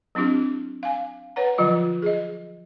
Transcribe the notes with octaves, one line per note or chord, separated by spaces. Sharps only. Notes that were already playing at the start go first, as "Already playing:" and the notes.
F#3 C4 D4 E4 G4
F5 G#5
B4 C#5 F#5 A#5
D3 F3 F#3 F4 D#5
G#4 D#5